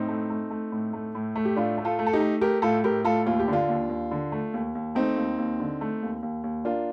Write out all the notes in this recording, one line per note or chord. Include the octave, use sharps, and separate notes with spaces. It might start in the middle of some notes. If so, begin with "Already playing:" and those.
Already playing: A2 C4 D#4
A3
A3
A3
A2
A3
A2
A3
G4
A2 D4 F4
A3
F4 A4
A3
A4
D#4 G4
A3
A3 G4 A#4
A2 F4 A4
A2 G4 A#4
A2 F4 A4
D#2 F4
G4
D3 D4 F4
D#2
D#2
D3
A3
D#2
D#2
A3 C4 D#4
D#2
D#2
D3
A3
D#2
D#2
D#2
A#3 D4 F4